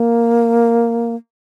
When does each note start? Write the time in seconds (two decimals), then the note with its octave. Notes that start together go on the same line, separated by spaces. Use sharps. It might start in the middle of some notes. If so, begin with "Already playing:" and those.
Already playing: A#3